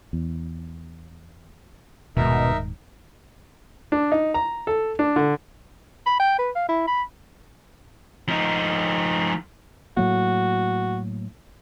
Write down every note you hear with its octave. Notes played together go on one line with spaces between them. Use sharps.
E2
D#1 G#2 B2 D#4 A#4 E5
D4
D#4
A#5
A4
D4
D3
B5
G5
B4
F5
E4
B5
F3 D#4
A2 F#3 A#3 F#4